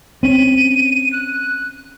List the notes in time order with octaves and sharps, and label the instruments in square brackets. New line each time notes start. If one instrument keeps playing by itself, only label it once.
[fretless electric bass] C4 C#4 [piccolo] D#7
[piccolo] F#6